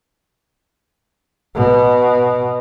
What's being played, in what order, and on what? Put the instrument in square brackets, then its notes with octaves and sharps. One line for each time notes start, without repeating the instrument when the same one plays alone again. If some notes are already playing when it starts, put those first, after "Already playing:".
[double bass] B2